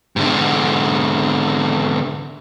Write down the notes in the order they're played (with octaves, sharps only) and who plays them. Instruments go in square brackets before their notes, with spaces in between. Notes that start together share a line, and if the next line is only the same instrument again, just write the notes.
[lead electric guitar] G#2 D3